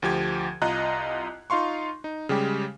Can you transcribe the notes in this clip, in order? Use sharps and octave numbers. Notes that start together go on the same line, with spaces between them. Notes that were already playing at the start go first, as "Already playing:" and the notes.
D2 F3 G4 G#6
C2 F4 D#5 A#5 F#6
D#4 F4 F5 C6 C#6
D#4
C#3 G3 G#3 G4